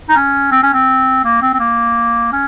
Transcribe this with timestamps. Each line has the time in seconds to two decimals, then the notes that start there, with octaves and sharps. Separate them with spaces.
0.09 D#4
0.16 C#4
0.52 C4
0.63 C#4
0.74 C4
1.24 A#3
1.42 C4
1.54 C4
1.60 A#3
2.32 C#4